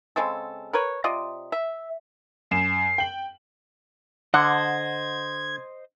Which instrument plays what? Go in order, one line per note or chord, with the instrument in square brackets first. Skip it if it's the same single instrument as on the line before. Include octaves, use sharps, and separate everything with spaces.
[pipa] C#3 G#3 C4 A4
A#4 B4 C#5
C3 F4 D5 D#5
E5
[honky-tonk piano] F#2 E7 [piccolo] C7
[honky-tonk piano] G5 F#7
[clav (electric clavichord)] D3 [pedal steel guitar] C5 D#5 [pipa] F#5 [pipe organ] G#6